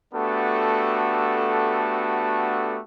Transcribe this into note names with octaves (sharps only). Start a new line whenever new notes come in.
A3 B3 D4 F#4 G4 A4